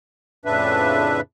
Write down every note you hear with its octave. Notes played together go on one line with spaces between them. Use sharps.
F2 A2 C#3 D4 B4 E5